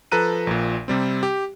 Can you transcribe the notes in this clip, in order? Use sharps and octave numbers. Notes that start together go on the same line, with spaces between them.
F3 A4 B4 A#5 F#6 D#7
A#1 A#2
C3 G3 C4
G4